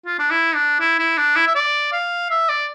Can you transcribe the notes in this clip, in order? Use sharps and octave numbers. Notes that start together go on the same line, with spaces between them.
F4
D4
E4
D4
E4
E4
D4
E4
E5
D5
F5
E5
D5